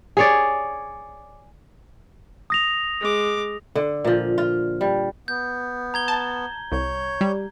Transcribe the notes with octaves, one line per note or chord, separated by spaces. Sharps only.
G#4 C#5 D5
D#6 A#6 F7
G#3 D6
D3
A#2 F3
F4
G3
B3 G6
A#5 G#6 G7
A5
C2 C#5 G6
G3